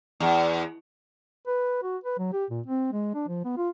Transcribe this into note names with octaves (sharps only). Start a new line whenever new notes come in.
E2
B4
F#4
B4
F#3
G4
A#2
C4
G#3
D4
F3
B3
F4